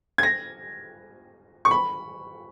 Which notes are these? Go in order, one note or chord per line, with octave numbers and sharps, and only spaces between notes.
G#6
A#6
C#6
B5